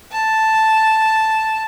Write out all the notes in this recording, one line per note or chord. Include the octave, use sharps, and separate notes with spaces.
A5